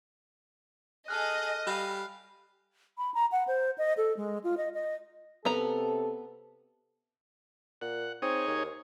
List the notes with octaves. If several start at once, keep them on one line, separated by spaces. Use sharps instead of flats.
G#4 A4 D#5 G#5 F6 F#6
G3 F5 B5
B5
A#5
F#5
C5
D#5
A4
G#3
F4
D#5
D#5
C3 B3 A4 A#5
A#2 F#5
C4 D#4 G#4 C#5
D#2